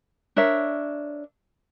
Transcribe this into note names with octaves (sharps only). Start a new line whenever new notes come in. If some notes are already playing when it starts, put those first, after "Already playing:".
D4 A#4 C#5 E5